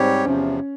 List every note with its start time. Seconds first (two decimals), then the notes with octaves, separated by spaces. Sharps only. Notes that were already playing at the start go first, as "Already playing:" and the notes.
Already playing: G#2 G3 C4 G4 C#5
0.25 E2 C3 F3 C#4